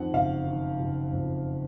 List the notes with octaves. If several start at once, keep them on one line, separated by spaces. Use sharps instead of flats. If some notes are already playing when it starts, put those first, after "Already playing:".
Already playing: F2 D#3 F#5
F#1 F5
D#3
F#1
F2